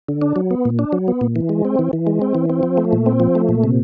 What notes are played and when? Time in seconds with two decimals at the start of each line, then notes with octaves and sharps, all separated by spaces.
0.09 D3
0.22 D4
0.36 F#3
0.51 B3
0.65 A#2
0.79 D4
0.93 F#3
1.08 B3
1.21 A#2
1.36 E3
1.49 G#3
1.65 C4
1.79 E3
1.93 E3
2.07 G#3
2.22 C4
2.35 E3
2.50 C4
2.63 F3
2.78 A3
2.93 A#2
3.06 C4
3.20 F3
3.35 A3
3.49 A#2
3.64 C3